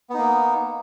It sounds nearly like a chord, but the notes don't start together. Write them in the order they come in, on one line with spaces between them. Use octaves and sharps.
B3 D#4 A#3